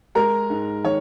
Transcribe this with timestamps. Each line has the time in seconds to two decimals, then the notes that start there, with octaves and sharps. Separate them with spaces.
0.15 G#3 A#4 A#5
0.50 G#2
0.84 D#3 C#5 C#6